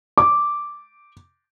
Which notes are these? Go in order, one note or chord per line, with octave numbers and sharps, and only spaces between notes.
D6